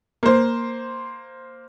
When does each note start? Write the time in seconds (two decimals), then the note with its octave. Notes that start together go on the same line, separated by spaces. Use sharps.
0.23 A#3 C5